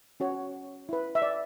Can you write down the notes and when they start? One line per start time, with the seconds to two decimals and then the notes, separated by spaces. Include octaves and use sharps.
0.20 C#4 F#4 C#5
0.89 E4 B4
1.15 E5
1.22 D5